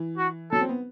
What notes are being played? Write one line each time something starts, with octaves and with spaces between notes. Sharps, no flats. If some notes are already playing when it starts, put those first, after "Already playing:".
Already playing: E3
F#4
F#3 A4
C4
B3